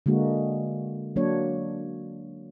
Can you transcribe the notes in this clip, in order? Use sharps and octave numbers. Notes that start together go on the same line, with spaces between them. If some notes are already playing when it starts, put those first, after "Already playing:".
D3 G#3 A#3 F#4
F#3 A#3 D4 C#5